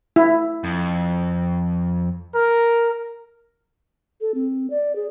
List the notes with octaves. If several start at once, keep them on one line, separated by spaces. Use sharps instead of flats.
E4
F2
A#4
A4
C4
D5
G#4